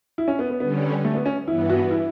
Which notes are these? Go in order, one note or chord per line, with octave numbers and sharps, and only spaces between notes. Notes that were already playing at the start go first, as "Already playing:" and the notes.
E4
C#4
B3
B3
D3 G3 B3 C#4
A3
B3
C#4
G2 E3 B3 E4
F#4
E4